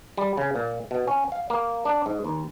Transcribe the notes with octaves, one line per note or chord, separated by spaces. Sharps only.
G3
C#3
A#2
B2
C#4
F5
A#3
D4
G#2
D#2